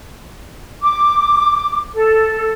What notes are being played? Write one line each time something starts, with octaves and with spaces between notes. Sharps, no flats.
D6
A4